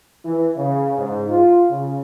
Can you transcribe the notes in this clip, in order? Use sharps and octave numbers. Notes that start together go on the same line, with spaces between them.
E3
C#3
G#2
F4
C#3